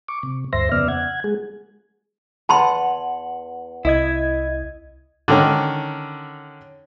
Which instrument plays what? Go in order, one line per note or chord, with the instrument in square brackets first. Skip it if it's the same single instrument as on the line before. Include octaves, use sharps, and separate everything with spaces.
[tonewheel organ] C#6 D6
C3
D2 G2 C5 E5 C6 A#6
F2 C#3 B3 D5 E5 F6
F#5 G#6
G#3 G#4
[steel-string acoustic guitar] E2 F#5 [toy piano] A5 B5 C6
[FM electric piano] C2 D#5 G#6 [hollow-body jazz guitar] E4
[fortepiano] D3 D#3 C#4